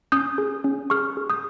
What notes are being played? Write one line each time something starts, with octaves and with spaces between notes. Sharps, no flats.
C#4 D#6 G6
G#4
C#4
G#4 C#6 F6
G#4
D#6 G6